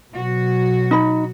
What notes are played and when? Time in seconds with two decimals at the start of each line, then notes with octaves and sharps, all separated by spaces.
0.13 B2 F#3 F#4
0.91 D#4 B5